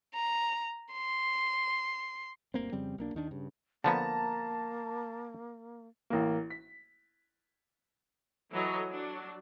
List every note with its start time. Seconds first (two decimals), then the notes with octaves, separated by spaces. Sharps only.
0.15 A#5
0.93 C6
2.54 G1 D2 A#3 C4
2.72 F2 C#3 G3 C4
2.98 B1 A#3 D4
3.14 D#2 D#3 D4
3.31 G2 C#3
3.84 D3 F3 A#3 B3 A5 A#5
6.10 A1 A#3
6.50 B6
8.52 E3 F#3 A4 C#5 D#5 A#5
8.89 F#3 D4